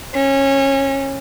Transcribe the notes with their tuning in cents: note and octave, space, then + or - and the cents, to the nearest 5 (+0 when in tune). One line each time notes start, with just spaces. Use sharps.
C#4 -20